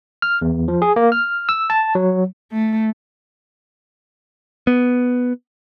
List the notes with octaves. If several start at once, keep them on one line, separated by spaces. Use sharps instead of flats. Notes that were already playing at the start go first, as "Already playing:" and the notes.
F6
E2
F3
G#4
A#3
F6
E6
A5
F#3
A3
B3